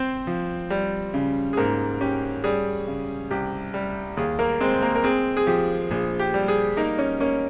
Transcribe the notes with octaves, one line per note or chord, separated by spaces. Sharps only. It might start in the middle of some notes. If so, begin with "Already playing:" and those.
Already playing: C4 C5
F3
G3
C#3
G#4
G#2 A#3 A#4
C#4 G4
G3 G#4
C#3
C2 G4
G3
D#2 G#4
A#3 A#4
G#3 C4 C5
A#3 A#4
A#4
C4 G#4
G#4
F3 G4
A#1 G#4
G4
G3
G#4
A#3 D#4 A#4
C#4 C#5
A#3 C#4 C#5